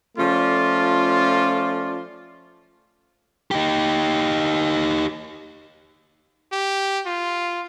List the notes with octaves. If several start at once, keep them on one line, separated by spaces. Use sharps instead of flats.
F3 A3 C#4 F4 D5
D#4 G4
G4
F4